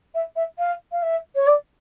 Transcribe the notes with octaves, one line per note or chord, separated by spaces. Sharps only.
E5
E5
F5
F5
E5
C#5
D5